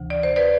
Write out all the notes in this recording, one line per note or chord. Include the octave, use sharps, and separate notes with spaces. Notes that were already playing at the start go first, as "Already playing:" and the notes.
Already playing: D2 C3 E3
D5
C5
B4 D5